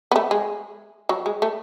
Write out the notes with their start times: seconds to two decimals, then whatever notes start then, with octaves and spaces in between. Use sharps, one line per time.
0.11 B3
0.16 A3
0.31 G#3
1.09 F#3
1.26 G#3
1.42 A3